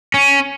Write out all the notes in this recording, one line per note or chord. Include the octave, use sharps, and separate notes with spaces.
C#4